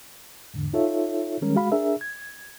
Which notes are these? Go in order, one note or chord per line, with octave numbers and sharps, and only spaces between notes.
E2 G#2 D3
D#4 F4 A4 C#5 E5
D#3 G3 G#3 C#4 A#4
G#3 F#4 F5 B5
D4 G#4 A#4 E5
G#6